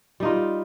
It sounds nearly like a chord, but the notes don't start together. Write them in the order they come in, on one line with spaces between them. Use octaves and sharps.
G3 D#4 F4